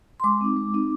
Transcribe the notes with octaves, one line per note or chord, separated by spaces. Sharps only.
C6
G#3 D6
C4 D#4
G#3
C4 D#4